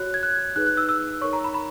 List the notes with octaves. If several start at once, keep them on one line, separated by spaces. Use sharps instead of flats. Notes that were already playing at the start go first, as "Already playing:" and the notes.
Already playing: F#4 C#5 F#6
G#6
F#6
D#4 G#4 B4 F#6
F#6
E6
E6
D#4 A#4 C#5 C#6
A#5
B5
B5